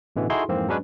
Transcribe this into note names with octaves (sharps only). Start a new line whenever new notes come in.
A1 B2 D3 E3
D#4 E4 F#4 G#4 A4 C6
F2 G#2 E3 A#3 C4
F#3 G#3 C#4 D4 B4 C#5